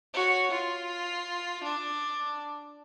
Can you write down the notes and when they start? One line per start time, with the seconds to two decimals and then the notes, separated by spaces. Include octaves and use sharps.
0.13 F#4 C#5
0.51 F4
1.63 D4